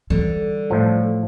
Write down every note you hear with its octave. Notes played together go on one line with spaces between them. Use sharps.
D3 E3 G3
A2 F3